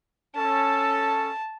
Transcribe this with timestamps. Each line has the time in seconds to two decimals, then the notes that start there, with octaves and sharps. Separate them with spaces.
0.36 C#4 A4 A5